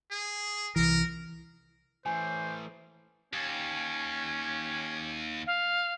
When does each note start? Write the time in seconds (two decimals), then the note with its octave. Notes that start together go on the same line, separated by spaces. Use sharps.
0.11 G#4
0.76 C2 E3 A#4
2.06 E3 A3 C5 G#5
3.33 D#2 C#4
5.47 F5